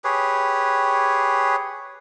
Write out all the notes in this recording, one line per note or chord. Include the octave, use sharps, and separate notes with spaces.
G4 G#4 B4 C#5